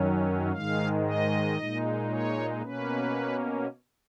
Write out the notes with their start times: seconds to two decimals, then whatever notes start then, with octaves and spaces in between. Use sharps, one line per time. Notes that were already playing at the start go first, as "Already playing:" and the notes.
Already playing: F#2 D#3 F#3 C#4
0.52 G#2 D#3 G#3 F5
1.04 D#5
1.57 A#2 G#3 D#4
2.09 C#5
2.63 B2 A#3 C#4 B4